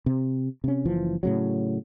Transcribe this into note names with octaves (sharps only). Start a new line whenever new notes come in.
C3
C3 C#4
F#1 E3 F3
A2 C#3 F#3